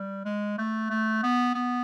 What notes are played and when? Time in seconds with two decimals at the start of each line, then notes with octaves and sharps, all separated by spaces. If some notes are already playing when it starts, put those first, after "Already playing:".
Already playing: G3
0.25 G#3
0.58 A3
0.90 A3
1.23 B3
1.55 B3